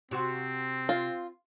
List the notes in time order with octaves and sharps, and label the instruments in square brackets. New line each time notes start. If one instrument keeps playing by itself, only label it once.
[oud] C3 F#4 [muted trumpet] C4
[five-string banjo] F4